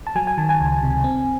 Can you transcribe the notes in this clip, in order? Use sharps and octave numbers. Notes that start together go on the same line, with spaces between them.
A5
F#3 G#5
G#5
D#3 A5
G#5
C#2
C3
C4